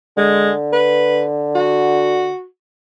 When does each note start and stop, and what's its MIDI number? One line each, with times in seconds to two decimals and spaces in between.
0.17 2.31 50
0.17 0.51 56
0.73 1.23 71
1.55 2.44 66